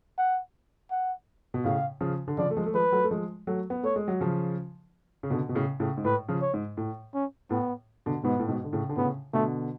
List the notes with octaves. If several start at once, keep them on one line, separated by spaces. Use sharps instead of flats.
F#5
F#5
B2
A2 C#3 F5
C#3 F3
D3
C#3 F3 D5
A3
F3 G#3
A3
F3 G#3 B4
F#3 A3
A3
F3 G#3
F#3 A3
B3
A3 C#5
G#3
F#3
C#3 F3
C#3
B2 D3
B2
A2 C#3
A2 C#3
G#2
A2 B4
C#3 F3
C#5
G#2
A2
C#4
A2 B3
B2 D3
G#2 B2 B3
A2
G#2 B2
D3
A2 C#3
D3
A2 C#3 B3
B2 D3 A3